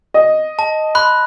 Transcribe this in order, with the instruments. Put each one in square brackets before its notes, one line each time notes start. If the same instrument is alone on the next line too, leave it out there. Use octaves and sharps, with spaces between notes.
[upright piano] D#5
[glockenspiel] A5
B5 C6 F#6